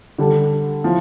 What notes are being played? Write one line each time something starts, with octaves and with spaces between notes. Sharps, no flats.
D3 G3 D4 A4
A2 F3